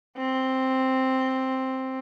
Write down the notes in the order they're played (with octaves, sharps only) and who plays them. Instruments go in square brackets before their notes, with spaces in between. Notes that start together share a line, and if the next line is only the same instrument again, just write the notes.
[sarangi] C4